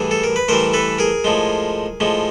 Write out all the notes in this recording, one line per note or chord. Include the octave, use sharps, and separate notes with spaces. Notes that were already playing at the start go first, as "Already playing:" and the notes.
Already playing: A2 E3 G3 G#4
A4
A#4
B4
A2 E3 G3 A#4 C5
A4 B4
G#4 A#4
A2 F3 G#3
A2 F3 G#3